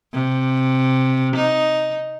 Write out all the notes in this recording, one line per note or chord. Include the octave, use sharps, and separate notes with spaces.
C3
D#4